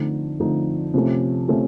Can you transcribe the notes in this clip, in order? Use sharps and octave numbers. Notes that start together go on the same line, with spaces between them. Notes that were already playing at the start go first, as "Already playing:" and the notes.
Already playing: D3 F3 A3 C4 D#4
D3 F3 A3 C4 D#4
C3 F3 A3 C#4
C3 F3 A3 C#4